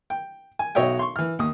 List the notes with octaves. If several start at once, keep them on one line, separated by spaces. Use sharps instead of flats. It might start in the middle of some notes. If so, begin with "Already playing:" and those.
G5
G#5
B1 F#4 C#5 D#5 E5 G5
C6 C#6
E3 F6
D#2 D#6